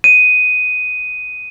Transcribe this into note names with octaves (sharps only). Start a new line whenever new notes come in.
D#7